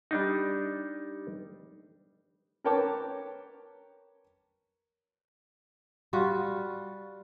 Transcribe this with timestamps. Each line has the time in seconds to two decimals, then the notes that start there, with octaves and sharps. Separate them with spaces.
0.11 G3 D4 D#4
2.64 A#4 B4 C#5 G5 A5 D6
6.13 G3 F4 F#4